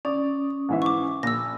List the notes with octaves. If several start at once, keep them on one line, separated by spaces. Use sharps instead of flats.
C#4 D5 D#6
G#2 E3 E5
C#6 D6
A#1 E6 A#6